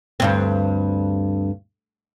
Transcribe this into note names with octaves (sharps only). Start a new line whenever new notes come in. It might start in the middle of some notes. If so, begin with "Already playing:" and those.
D2 G2 C4